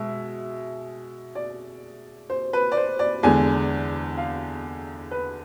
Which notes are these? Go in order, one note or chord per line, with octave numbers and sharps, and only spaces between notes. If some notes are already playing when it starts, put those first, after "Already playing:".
Already playing: B2 G#3 E5
D5
C5
B4
D5
C5
D5
E2 D3 G#3 G#5
F5
B4